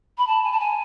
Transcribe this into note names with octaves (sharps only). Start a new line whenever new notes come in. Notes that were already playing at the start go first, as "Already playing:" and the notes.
B5
A5
G#5
A5
G#5